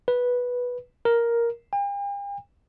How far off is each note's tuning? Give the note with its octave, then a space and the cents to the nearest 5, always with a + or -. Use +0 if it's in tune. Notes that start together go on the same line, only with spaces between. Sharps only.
B4 -10
A#4 +5
G5 +45